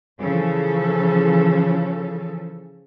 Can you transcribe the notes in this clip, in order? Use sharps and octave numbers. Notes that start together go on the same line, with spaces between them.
C#3 E3 F3 C#4 A4